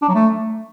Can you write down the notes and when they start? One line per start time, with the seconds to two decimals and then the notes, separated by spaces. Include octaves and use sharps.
0.02 D4
0.08 F#3
0.15 A3